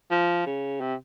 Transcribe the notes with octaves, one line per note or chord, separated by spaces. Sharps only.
F3
C#3
C3